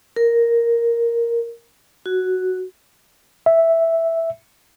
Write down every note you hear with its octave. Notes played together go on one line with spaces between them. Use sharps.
A#4
F#4
E5